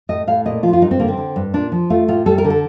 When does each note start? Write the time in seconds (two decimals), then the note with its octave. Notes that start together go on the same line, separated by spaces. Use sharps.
0.09 A2 D#5
0.27 A2 F5
0.45 A#2 D#5
0.63 F3 F4
0.73 F4
0.82 G2 D#4
0.91 C4
1.00 D3 A#3
1.08 C4
1.17 D3
1.36 G2
1.54 A#2 D4
1.72 F3
1.90 A3 F4
2.08 A2 F4
2.26 G3 A4
2.38 A#4
2.45 D3
2.50 A4